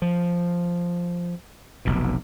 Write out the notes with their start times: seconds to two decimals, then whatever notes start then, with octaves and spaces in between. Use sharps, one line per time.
0.02 F3
1.85 F1 B1 B2